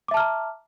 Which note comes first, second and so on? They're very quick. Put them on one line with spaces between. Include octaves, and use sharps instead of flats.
D6 E5 A5 F6 A#5